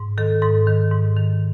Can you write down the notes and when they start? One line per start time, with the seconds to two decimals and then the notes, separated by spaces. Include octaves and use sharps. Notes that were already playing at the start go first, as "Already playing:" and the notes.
Already playing: G#2
0.18 D#3 A4
0.42 G#2 A4
0.67 D#3
0.92 G#2
1.16 D#3